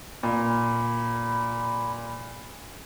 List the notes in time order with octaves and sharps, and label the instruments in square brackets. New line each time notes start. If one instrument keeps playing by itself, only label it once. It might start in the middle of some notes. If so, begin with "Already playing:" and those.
[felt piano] A#2 [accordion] B5